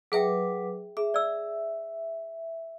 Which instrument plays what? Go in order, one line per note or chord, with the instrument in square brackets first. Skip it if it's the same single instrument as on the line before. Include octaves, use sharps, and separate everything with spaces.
[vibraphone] F#3 B4 D6 [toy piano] G#4 E5 G5
[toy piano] G#4 [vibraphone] E5
[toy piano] D5 E6